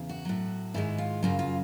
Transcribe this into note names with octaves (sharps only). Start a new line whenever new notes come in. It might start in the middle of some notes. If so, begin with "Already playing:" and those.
Already playing: E2 C#3
F#4
A2 F#3
G#2 D#3 G#3 E4
F4
F#2 C#3 F#3 F4
F4